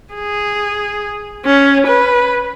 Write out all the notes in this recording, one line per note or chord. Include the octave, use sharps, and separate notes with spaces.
G#4
C#4
B4